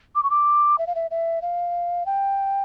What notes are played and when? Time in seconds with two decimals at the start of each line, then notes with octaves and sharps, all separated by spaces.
0.15 D6
0.23 C#6
0.30 D6
0.78 E5
0.87 F5
0.95 E5
1.11 E5
1.42 F5
2.06 G5